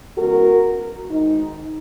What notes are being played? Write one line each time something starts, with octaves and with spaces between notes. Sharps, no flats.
E2 C#3 G#3 B3 F#4 A#4
G#2 D#3 G#3 D#4